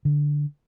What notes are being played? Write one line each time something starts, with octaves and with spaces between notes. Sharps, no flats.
D3